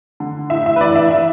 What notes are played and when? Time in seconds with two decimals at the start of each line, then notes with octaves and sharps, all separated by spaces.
0.20 D3
0.50 A2 E5
0.66 E5
0.76 B4
0.81 E3 D5
0.96 E5
1.11 E3 E5